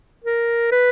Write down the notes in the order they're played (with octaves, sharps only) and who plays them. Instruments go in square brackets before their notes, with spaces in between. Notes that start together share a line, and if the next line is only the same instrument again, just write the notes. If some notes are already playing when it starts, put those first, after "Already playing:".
[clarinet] A#4
B4